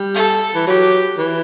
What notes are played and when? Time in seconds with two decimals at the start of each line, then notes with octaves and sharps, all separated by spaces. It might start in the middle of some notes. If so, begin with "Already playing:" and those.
Already playing: G3
0.15 A4
0.55 E3
0.67 F#3 G4
1.18 E3